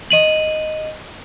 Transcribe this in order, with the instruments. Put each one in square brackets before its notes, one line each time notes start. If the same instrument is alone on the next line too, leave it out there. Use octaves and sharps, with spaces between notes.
[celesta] D#5 D#7 F#7